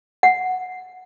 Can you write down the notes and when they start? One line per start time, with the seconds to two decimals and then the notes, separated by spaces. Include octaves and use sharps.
0.23 F#5